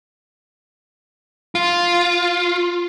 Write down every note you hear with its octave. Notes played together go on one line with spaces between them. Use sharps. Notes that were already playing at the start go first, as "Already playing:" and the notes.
F4